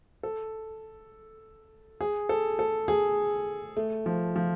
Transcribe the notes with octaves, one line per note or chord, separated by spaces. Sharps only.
A4
G#4
A4
A4
G#4
A3
F3
F3